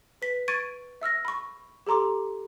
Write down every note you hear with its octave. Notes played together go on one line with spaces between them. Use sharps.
B4 B6
C#6 G#6 A6 D7 D#7
E5 E6 F6 A#6
B5 C#6
G4 A4 A#5 C6 D6